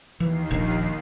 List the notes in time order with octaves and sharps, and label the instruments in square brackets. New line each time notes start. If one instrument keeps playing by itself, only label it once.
[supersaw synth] D#2 D#3 C7 [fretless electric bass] E3
[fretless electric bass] D#1 A#1